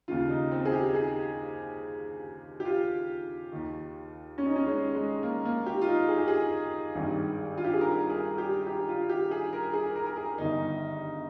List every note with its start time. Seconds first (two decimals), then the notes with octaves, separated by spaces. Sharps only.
0.08 D#2 C#3 F4
0.29 D#4
0.52 C4
0.65 G#4
0.72 G4
0.95 G#4
2.60 G4
2.65 F4
3.52 D#2 D#3
4.38 C#4
4.46 D#4
4.56 C#4
4.66 G#3
4.95 G#3
5.23 A#3
5.45 A#3
5.66 G4
5.82 F4
5.88 D#4
6.09 G#4
6.17 G4
6.28 G#4
6.95 G#1 G2 D#3
7.58 F4
7.64 G4
7.73 G#4
7.81 A#4
8.10 G#4
8.38 G4
8.67 G4
8.88 F4
9.09 G4
9.31 G#4
9.53 A#4
9.73 G#4
9.96 A#4
10.06 A#4
10.17 G#4
10.38 G1 G2 D#3 D#4